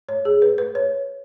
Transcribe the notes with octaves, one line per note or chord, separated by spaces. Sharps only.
C#5
G#4
B4
B4
C#5